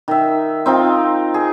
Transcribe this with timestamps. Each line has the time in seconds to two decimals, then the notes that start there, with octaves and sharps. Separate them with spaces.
0.08 D#3 E5
0.66 C4 D#4 F4 A#4
1.34 G#4